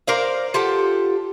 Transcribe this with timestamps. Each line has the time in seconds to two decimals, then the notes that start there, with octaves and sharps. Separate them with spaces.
0.07 A#4 C5 D5 F5
0.54 F4 G4 A4 F#5